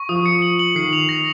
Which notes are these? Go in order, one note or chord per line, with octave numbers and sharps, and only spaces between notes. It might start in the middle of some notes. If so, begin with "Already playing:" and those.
Already playing: C#6
F3 D#6
C#7
F#7
F#7
D#3 C7
F7
A#6